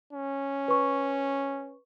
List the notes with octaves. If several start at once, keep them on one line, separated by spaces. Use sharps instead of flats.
C#4
B4 C#6